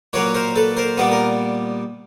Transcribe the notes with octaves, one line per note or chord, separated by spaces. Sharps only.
A#2 F#3 A#3 B4 C#5
A#4 C5
A4 B4
A#4 C5
A#2 G3 B3 B4
A#4